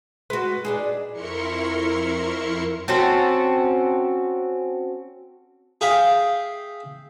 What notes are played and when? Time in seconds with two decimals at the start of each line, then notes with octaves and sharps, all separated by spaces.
0.30 G#3 F#4 B4
0.65 D4 D#4 G#4
1.12 F2 E4 A#4 C6 C#6 C#7
2.88 C4 C#4 F#4 A4
5.81 G#4 E5 F5 G5